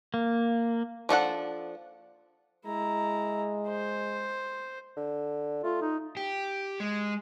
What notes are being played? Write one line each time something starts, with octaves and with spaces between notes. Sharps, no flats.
A#3
F3 D4 A4 F#5
G#3 E4 A#5
C5
D3
A3 F4
D#4
G4
G#3